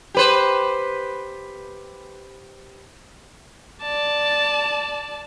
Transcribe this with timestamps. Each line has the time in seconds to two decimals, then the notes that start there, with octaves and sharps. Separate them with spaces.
0.14 G4 B4 C5
3.82 D5 A5